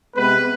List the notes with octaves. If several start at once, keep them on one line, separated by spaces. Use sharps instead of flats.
C3 G#3 B3 B4